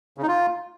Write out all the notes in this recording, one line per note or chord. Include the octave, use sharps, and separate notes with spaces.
C#3
D#4
F4